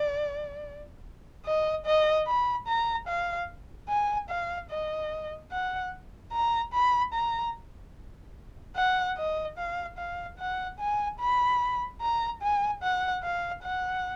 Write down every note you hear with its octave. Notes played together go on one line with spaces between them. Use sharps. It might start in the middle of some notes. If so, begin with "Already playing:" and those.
Already playing: D5
D#5
D#5
B5
A#5
F5
G#5
F5
D#5
F#5
A#5
B5
A#5
F#5
D#5
F5
F5
F#5
G#5
B5
A#5
G#5
F#5
F5
F#5